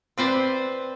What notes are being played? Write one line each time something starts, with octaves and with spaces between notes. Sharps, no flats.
C4 B4 C5 D5